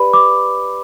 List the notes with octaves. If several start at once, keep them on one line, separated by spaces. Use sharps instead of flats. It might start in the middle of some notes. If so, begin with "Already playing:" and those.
Already playing: G4 B4 D5 B5
D6